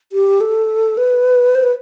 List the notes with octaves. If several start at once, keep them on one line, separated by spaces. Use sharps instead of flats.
G4
A4
B4
C5
B4